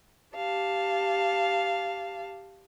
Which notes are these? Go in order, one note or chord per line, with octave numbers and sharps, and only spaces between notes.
G4 F5 A5